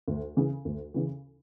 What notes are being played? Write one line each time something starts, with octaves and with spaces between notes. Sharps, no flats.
D2
C#3 E3
D2
C#3 E3